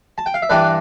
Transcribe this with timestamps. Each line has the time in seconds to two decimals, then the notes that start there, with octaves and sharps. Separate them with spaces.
0.18 A5
0.26 G5
0.34 F5
0.42 E5
0.49 G2 E3 G3 D4 B4 D5